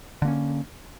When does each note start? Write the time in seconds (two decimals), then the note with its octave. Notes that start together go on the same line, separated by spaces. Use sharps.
0.22 D3
0.25 A#3
0.28 C#4